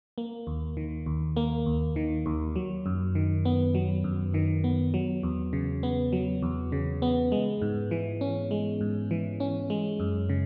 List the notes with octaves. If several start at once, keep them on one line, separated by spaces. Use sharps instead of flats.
A#3
D#2
D#3
D#2
A#3
D#2
D#3
D#2
F#3
F#2
D#3
B3
F#3
F#2
D#3
B3
F#3
E2
C#3
B3
F#3
E2
C#3
B3
G#3
G#2
E3
C#4
G#3
G#2
E3
C#4
G#3
F#2
C#3